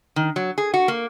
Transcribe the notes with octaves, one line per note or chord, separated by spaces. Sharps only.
D#3
F#3
G#4
F#4
A#3